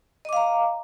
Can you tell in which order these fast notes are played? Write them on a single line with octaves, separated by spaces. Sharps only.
D#5 D6 F5 A#5